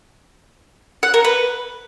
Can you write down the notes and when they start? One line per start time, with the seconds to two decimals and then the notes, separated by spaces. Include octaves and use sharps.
1.03 F#5
1.14 A#4
1.25 B4